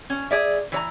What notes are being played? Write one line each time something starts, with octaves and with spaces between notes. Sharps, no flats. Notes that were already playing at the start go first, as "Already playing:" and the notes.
C#4
G#4 D5 E5
E3 C#5 A#5